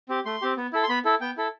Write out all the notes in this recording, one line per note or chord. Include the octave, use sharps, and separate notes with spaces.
C4 G4
A3 C6
C4 G4
B3
E4 A4
C6
B3 B5
E4 A4
B3 G5
E4 A4